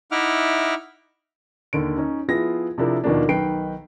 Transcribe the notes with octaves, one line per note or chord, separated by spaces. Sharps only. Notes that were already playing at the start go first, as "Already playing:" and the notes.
D#4 E4 E5 F#5 D6 F6
D#2 D3 D7
C#4 D#4
F3 B3 E4 F4 G#4 A#6
C3 F3 D4 E4 G#4 A#4
D#2 B2 D#3 F3 A#3 D4
B1 D#3 B4 G5 C7 D7